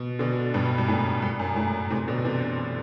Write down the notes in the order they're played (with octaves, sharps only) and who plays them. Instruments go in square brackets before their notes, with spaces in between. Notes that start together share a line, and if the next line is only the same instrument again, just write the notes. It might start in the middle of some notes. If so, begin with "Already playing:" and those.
Already playing: [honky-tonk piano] B2
B2 D3
G2 B2
G2
F#2 A2
G2
F#2
F#2 A2
A2 C3
B2 D3
C3 E3